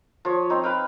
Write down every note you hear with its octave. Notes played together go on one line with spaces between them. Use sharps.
F3 C#5
C4 D#4
B4 F5 G5